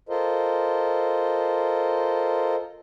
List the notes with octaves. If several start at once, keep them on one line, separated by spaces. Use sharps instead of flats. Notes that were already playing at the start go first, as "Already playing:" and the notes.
F4 A4 A#4 C5 D#5